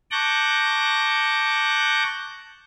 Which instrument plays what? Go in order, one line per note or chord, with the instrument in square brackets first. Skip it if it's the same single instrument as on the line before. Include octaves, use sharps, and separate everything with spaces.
[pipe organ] A5 C#6 D6 F#6 G6 A#6